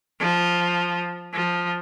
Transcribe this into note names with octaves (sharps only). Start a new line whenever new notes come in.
F3
F3